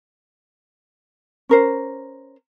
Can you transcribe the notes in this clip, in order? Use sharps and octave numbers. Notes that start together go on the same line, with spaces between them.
C#4 A#4 C5